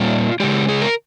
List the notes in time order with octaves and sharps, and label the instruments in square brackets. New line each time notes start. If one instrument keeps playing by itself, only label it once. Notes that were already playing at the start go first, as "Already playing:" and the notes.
Already playing: [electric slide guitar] A#2 G3 A#3 F4
C#3 G#3 G4
G#4
A#4